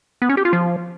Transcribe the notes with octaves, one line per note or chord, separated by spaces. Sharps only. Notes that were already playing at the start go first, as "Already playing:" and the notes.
B3
C#4
G4
F4
F3